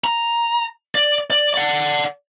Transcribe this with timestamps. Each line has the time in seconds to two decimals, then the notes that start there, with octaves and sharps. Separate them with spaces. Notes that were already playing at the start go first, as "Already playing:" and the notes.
0.04 A#5
0.95 D5
1.30 D5
1.54 D5 F#5